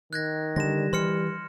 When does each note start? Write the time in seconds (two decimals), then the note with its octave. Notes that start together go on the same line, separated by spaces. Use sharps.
0.13 D#3 F#6 G#6 A#6
0.56 D3 G3 A#6 E7
0.93 E3 C6 F6 C#7